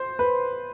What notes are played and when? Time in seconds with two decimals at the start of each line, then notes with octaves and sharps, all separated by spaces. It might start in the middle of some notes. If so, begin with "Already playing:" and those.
Already playing: C5
0.19 B4